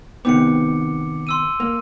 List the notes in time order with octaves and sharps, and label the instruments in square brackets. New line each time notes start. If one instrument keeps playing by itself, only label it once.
[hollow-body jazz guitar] C3 D#3 B3 [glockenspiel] D6 C#7
[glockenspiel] C6 E6 D#7
[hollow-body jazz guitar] A#3